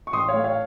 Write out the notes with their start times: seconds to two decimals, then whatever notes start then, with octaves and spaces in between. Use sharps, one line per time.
0.07 C#6
0.13 A1 C6 D#6
0.28 C#5 F5
0.34 A3
0.44 C#5 F5